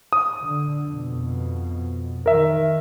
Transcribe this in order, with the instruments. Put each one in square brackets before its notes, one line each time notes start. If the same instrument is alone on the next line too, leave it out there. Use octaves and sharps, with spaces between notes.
[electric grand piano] D#6
[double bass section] D3
F2 B2
[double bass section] D#3 [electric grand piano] A#4 E5